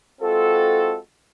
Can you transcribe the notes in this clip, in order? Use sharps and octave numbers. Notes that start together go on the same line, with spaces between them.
G#3 C4 F4 F#4 A4